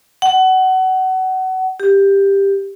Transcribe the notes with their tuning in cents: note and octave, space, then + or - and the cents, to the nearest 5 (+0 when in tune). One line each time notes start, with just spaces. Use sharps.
F#5 +25
G4 +10